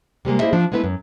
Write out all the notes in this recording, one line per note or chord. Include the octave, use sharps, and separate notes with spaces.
C3 G3 G#3 A#3
A#3 E4 G#4 C5 D#5 E5
F3 D4
G#3 A3 B3 E4 B4
F#2